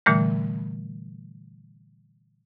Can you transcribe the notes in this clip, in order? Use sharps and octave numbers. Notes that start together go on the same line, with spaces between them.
A#2 D3 E3 G3 A3